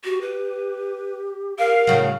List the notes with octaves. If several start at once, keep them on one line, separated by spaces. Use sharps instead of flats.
F#4 G4
B4
A#4 F5
A2 C#3 F#3